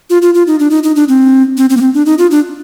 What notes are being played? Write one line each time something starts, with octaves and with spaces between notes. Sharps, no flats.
F4
F4
F4
D#4
D4
D#4
D#4
D4
C4
C4
C4
A#3
C4
D4
D#4
F4
D4